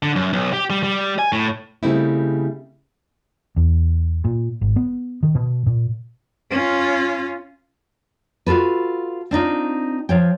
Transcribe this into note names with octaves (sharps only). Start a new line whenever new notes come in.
D3
F#2
B1
G4
G3
G3
G#5
A2
C#3 G3 A3 C4 D#4 E4
E2
A#2
G#1
B3
D#3
B2
A#2
C#4 F4
F4 F#4 A4 B4
C4 D4 D#4 F4
F3 C#5 G5